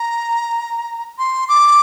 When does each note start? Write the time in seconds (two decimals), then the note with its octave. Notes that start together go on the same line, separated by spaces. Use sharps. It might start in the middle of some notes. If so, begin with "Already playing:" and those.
Already playing: A#5
1.18 C6
1.49 D6